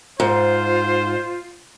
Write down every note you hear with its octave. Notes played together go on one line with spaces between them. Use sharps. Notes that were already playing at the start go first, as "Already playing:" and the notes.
G#2 F4 C5